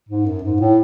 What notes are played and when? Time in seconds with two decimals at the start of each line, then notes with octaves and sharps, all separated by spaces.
0.09 G#2
0.26 F#2
0.43 G#2
0.60 A2